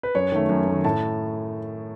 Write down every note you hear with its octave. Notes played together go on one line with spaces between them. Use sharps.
B4
F#2 C#5
D#3 A3
F#2
D#3 A3
A2 A5